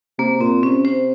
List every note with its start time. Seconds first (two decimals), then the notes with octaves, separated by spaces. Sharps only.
0.19 C3 A#3
0.40 A#2 C4
0.63 C3 C#4
0.85 C5